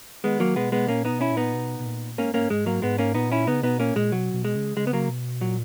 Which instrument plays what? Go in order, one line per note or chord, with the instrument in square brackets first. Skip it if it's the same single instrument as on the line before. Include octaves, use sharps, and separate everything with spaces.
[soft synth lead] D#3 [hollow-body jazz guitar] G#3 B3
[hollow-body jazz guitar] F#3 A#3
[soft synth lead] B2 [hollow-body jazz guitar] G#3 B3
[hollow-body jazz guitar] G#3 B3
[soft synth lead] A#2 [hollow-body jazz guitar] A#3 C#4
[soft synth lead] B2 [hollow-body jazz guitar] B3 D#4
[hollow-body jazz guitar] C#4 E4
[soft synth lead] A#2
[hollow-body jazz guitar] B3 D#4
[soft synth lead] B2
B2
A#2
[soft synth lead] G#2 [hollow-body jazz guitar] A#3 C#4
[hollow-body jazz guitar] A#3 C#4
[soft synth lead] G#2 [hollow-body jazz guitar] G#3
[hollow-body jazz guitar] F#3 A#3
[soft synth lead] G#2 [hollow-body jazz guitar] G#3 B3
[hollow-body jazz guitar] A#3 C#4
[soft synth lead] A#2 [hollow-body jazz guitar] B3 D#4
[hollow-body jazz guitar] C#4 E4
[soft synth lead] C#3 [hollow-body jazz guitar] B3 D#4
[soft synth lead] B2 [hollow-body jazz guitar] B3 D#4
[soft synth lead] A#2 [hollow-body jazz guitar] A#3 C#4
[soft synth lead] A#2 [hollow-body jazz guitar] G#3
[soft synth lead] B2 [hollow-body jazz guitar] F#3
[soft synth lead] B2
[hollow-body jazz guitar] G#3
[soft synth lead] C#3
[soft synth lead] C#3 [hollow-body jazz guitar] G#3
[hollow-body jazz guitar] B3
F#3 A#3
[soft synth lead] B2
[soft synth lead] A#2 [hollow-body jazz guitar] F#3